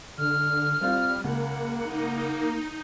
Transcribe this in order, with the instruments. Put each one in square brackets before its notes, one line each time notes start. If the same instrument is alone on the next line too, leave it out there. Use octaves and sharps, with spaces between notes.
[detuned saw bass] D3 [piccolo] F6
[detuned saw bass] G3 [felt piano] C4 F4
[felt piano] C#2 [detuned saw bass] A#3 [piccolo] F#5
[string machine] D#4